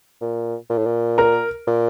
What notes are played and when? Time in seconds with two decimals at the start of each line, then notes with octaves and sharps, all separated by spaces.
0.21 A#2
0.70 A#2
0.78 A2
0.86 A#2
1.18 A#4 A#5
1.67 A#2